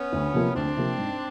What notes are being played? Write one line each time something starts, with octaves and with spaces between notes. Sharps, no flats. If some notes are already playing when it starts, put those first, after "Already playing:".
Already playing: B3 C#4
D2
C3 F3 A#3
D2 C4 D4
C3 F3 A#3
G#2